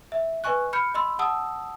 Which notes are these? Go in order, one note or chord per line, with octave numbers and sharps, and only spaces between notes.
E5
B4 D#5 G#5 C#6 F#6
B5 F6 G6 C#7
D#5 B5 C6 E6
F#5 A5 D#6 E6